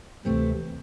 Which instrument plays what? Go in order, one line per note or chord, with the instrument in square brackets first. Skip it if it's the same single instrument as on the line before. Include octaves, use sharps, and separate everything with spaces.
[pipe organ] D2 C3 E3 [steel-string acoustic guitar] A3 C4